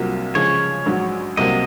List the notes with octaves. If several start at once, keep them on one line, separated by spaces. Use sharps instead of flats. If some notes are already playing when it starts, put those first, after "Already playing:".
Already playing: C2 C3 F#3 A#3 F4
C#3 F3 G#3 C#5
A#1 G#2 F#3
C2 C3 F#3 A#3 D#5